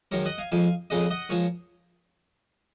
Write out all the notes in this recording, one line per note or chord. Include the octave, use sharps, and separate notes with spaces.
F#2 D#3 G#3 A#4 C#5
D#5 F#5
F5 G#5
F2 F3 G#3 F5 G#5
F2 C#3 G#3 D#5 F#5
D#5 F#5
F3 G#3 A#4 C#5